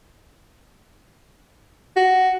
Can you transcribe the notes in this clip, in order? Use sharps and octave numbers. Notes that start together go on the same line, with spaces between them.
F#4